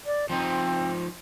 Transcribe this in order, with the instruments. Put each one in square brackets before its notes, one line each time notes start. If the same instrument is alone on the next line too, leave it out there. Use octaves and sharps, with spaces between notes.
[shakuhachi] D5
[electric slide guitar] F3 D#4 [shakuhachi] C4